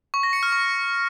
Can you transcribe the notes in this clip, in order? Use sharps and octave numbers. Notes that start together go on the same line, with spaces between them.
C#6
A#6
C#7
F6
C#6